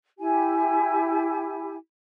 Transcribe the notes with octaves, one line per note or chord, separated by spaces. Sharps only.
E4 G4 G#5